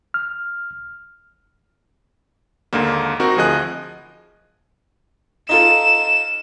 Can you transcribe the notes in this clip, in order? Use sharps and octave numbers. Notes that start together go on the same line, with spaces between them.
F6
D#2 G#2 D3 A#3
C4 D#4 F#4 A#4
D2 F3 G#4 D#5 F#6
D#4 F4 A4 E7